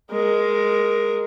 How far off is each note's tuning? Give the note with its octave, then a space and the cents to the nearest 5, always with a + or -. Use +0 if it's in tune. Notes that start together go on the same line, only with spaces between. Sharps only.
G#3 +0 A#4 +10